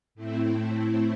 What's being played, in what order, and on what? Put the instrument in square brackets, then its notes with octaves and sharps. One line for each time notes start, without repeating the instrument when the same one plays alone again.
[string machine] A2 A3 C4 E4